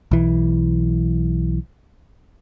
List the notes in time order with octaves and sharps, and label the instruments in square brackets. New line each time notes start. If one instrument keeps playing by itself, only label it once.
[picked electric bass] B1 E3